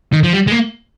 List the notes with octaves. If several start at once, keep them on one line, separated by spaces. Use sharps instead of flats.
D#3
F3
G3
G#3
A#3